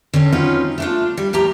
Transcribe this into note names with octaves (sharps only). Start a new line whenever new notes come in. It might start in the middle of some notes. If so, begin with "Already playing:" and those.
D3 C4 C#4
F#3 C4 C#4 D#4 F4 B4
A3 D4 F4
G3
A2 F3 G4 A#5